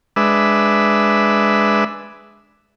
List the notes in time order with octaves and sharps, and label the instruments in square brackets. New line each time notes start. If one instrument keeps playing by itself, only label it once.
[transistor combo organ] G#3 D4 B4 E5